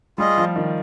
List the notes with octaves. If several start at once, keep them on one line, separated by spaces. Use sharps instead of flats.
G3 F4 G#4 D#5
F3
D#3